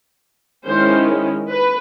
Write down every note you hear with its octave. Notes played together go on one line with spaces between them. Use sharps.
D#3 G#3 C#4 E4 C5
B4